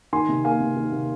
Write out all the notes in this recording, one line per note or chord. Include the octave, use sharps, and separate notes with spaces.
D#3 G#5 C6
C3
A#3 F5 G#5
C3
D#3
C3